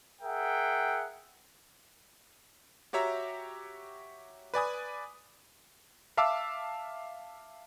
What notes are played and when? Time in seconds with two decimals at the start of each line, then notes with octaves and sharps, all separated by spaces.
0.22 G#4 A#4 E5 F#5 G5
2.93 F#4 G4 C#5 E5 A#5
4.54 B4 D5 G#5 D#6
6.17 E5 F5 A5 D6 E6